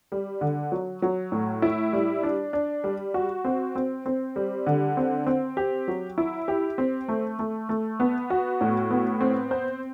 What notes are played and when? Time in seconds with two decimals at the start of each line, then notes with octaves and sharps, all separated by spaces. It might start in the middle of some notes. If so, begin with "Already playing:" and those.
0.12 G3
0.41 D3
0.72 F#3
1.02 F#3
1.32 A2
1.62 E4
1.93 G3
2.23 D4
2.53 D4
2.84 G3
3.14 F#4
3.45 C4
3.75 C4
4.06 C4
4.36 G3
4.66 D3
4.97 C4
5.27 C4
5.57 G4
5.88 F#3
6.18 E4
6.48 G4
6.78 C4
7.08 A3
7.39 A3
7.69 A3
8.00 B3
8.30 F#4
8.61 A2
8.91 B3
9.21 C4
9.51 C5